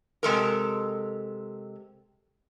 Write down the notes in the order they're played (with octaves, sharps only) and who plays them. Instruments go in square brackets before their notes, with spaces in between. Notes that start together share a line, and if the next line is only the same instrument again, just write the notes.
[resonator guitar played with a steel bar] C3 G#3 A4 A#4